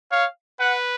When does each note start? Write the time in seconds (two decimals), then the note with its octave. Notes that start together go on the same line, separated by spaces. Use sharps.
0.11 C#5 F5
0.59 B4 F#5